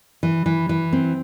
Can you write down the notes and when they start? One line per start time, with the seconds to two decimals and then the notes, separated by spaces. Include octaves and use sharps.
0.23 E3
0.46 E3
0.69 E3
0.93 C4